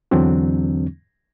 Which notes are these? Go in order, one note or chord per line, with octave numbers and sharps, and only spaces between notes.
E2 D3 E3 F#3 C4 D4